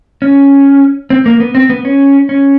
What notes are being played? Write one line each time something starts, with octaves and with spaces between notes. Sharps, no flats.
C#4
C4
A#3
B3
C4
B3
C#4
C#4